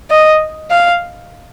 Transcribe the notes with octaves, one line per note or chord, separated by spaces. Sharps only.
D#5
F5